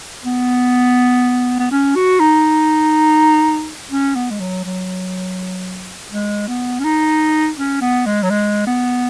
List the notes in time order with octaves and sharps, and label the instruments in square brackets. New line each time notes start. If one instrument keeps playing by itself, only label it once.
[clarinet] B3
B3
C#4
F#4
D#4
C#4
B3
G#3
F#3
F#3
G#3
B3
C#4
D#4
C#4
B3
G#3
F#3
G#3
B3